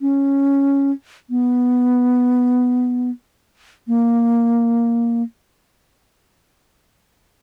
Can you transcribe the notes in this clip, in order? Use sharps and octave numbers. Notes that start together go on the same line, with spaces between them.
C#4
B3
A#3